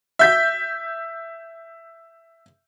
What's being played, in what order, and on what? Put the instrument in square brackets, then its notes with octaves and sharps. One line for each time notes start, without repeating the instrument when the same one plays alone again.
[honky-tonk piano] E5 G6 B6